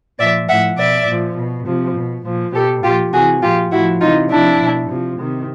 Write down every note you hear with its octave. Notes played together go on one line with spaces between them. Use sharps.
A#2 F3 D5 E5
A2 F3 E5 F#5
B2 D5 E5
A#2 F3
B2
C3 F3
B2
A#2 F3
B2 G4 A4
A#2 F3 F4 G4
C3 E3 F#4 G#4
A#2 F3 F4 G4
A2 F3 E4 F#4
C3 E3 D#4 F4
C3 F3 D4 E4
B2
C3 F3
C3 D#3